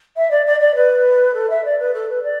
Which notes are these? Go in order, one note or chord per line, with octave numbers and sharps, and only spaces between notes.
E5
D5
D5
D5
B4
A4
E5
D5
B4
A4
B4
D5